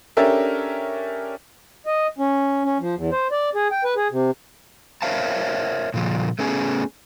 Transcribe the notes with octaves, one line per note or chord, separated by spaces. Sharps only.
C#4 D4 G4 A4 A#4 E5
D#5
C#4
C#4
F3
E2
C5
D5
G#4
G5
B4
G#4
C3
A#4 C5 C#5 E5 F5 A5
A#2 C#3 F3
A3 B3 C#4 G#4